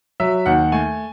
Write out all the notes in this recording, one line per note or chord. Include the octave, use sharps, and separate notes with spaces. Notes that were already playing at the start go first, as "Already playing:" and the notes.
F#3 E5
D#2 F#5
A3 G#5